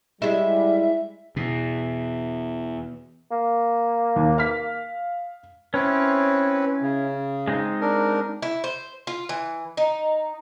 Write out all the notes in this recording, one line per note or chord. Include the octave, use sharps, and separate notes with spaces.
G3 G#3 E4 E5
E2 B2
A#3
D#2
F5 F6 B6
C4 C#4 E4 B4 C#5
C#3
G#3 C4 D#4
D4 A#4
E4
C5
F4
E3
D#4